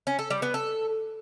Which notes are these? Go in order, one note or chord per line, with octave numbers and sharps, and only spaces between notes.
C#4
A4
G3
B3
A4